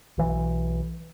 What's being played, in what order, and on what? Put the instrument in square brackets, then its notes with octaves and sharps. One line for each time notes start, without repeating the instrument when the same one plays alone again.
[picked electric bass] B1 E3